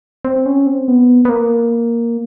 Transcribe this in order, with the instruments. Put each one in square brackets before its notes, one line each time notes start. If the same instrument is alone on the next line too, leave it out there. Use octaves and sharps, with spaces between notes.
[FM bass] C4
C#4
C4
B3
B3
A#3